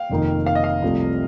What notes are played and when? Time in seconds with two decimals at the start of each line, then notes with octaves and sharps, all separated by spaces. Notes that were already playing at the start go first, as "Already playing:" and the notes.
Already playing: F5 G5
0.09 F1 F2 D#3 A#3 D#4
0.46 F5
0.55 D#5
0.64 F5
0.82 C2 C3 F3 A3